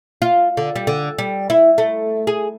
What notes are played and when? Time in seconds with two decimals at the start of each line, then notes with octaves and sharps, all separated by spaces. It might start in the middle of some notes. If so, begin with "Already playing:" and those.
0.22 F4
0.57 D3
0.76 G3
0.87 D3
1.18 G3
1.50 E4
1.78 A3
2.27 G#4